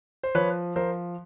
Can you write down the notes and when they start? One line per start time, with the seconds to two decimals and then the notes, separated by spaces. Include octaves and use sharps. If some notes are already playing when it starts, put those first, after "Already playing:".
0.23 C5
0.35 F3 B4 C#5
0.76 F3 A#4 C5